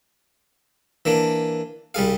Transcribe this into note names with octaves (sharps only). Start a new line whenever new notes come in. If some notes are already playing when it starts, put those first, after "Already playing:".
E3 A#3 D4
C2 G3 G#4 F5